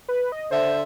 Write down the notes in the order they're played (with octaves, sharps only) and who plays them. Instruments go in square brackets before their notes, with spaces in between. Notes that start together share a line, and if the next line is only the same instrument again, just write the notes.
[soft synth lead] B4
D#5
[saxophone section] D3 E5 [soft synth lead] C5